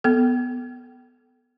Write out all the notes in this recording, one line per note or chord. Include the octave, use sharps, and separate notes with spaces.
B3 A4